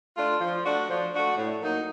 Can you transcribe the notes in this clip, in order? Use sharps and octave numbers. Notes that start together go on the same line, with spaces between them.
A3 D4 F4
F3
A3 D4 F#4
F3
A3 D4 F#4
A2
F#3 A#3 D#4